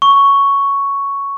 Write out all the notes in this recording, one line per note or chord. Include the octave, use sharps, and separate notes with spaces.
C#6